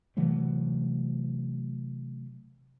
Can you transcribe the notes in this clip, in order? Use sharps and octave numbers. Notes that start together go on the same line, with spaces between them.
C3 E3 F#3 A3